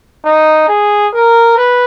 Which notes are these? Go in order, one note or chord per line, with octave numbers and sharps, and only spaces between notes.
D#4
G#4
A#4
B4